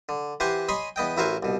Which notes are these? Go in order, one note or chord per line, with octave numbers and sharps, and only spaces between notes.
D3
E3 G4 C5 F#5 G#5 C6
C#5 D#5 G#5 B5 C6
E2 B3 D#5 G5
A1 E4 F#4 A#4 C5 G#5
C2 B2